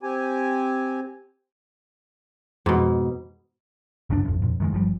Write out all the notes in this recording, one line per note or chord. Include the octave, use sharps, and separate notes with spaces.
C4 G4 G#5
F2 G#2 B2 E3
G1 C#2 F#2 D4
A1 F2
F2 A#2
F#2 D#3 G#3
G1 F3 G3